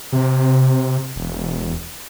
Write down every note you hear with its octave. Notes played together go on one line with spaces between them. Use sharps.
C3
E1